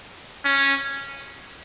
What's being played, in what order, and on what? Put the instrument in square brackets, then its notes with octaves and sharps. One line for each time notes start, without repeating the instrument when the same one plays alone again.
[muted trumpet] C#4